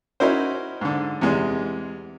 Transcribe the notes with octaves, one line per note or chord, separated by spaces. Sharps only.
C#4 D#4 E4 F#4 A#4 C5
G#2 D3
E2 C3 G#3